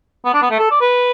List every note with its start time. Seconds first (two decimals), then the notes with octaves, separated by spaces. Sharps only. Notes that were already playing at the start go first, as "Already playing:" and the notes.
0.25 B3
0.34 D4
0.42 B3
0.51 A3
0.59 A4
0.71 D5
0.81 B4